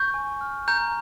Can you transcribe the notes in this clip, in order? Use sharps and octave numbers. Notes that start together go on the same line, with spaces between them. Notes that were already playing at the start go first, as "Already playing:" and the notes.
Already playing: C#6 G6
G#5
F6
A#5 G6